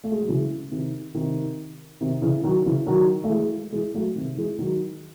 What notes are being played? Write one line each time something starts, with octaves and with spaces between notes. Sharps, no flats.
A3
G#3
F#3
C#3 E3
C3 D#3
C3 D#3
C3 D#3
C#3 E3
D#3 F#3
C#3 E3
D#3 F#3
A3
E3 G#3
E3 G#3
F#3 A3
C3 D#3
E3 G#3
D#3 F#3